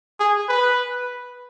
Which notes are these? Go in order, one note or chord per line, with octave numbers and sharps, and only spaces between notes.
G#4
B4